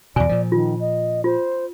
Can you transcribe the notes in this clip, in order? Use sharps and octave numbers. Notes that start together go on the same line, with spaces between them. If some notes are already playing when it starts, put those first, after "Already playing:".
E2 B2 D5 G#5
A#2 F3
D#3 F4
D#5
F4 C5